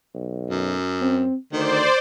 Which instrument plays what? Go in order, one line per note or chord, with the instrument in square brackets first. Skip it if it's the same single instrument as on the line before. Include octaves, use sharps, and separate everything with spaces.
[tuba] B1
[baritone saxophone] F#2
[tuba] C4
[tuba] D2 [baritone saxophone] D#3 [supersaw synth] C5 D5